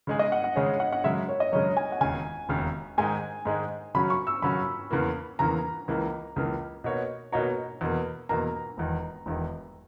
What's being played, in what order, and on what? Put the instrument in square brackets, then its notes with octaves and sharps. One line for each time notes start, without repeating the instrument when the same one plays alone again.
[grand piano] C#3 G#3 D#4 G#4
[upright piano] D#5
F#5
F#5
[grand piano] C#3 G#3 D#4 G#4 [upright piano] C#5
[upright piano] F#5
F#5
[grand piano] F#2 C#3 G#3 [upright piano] E5
[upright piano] C#5
D#5
[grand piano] F#2 C#3 G#3 [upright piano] C#5
[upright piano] G#5
F#5
[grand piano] E1 D#2 C#3 [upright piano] G#5
[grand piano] E1 D#2 C#3
[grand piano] G#2 D#3 G#3 D#4 G#4 [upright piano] G#5
[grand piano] G#2 D#3 G#3 D#4 G#4
[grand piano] F#2 C#3 F#3 C#4 F#4 [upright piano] B5
[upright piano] C#6
E6
[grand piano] F#2 C#3 F#3 C#4 F#4 [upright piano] B5
[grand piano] E2 C#3 E3 A#3
[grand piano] E2 C#3 E3 A#3 [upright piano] A#5
[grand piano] C#2 C#3 E3 A#3
C#2 C#3 E3 A#3
B2 A#3 D#4 F#4 C#5
[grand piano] B2 A#3 D#4 F#4 C#5 [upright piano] A#5
[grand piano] E2 B2 A#3
[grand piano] E2 B2 A#3 [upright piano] A#5
[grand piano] E1 E2 D#3
E1 E2 D#3